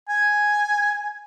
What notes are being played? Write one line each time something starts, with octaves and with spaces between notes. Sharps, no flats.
G#5